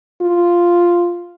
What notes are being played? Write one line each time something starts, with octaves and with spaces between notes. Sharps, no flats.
F4